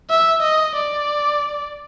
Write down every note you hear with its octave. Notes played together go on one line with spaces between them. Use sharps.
E5
D#5
D5